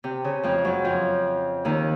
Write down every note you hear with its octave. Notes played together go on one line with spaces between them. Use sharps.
C3
C#3
F2 F3
F#2 F#3
F2 F3
D#2 D#3